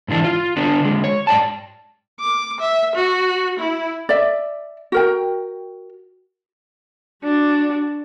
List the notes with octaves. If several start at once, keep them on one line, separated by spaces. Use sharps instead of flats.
G#2 D3 E3 D4 E4
F4
D3 B3 D4
D3 G#3
C#5
G#2 D5 G5 A5
D6
E5
F#4
E4
D5 E5
F#4 A#4 G5
D4 F#4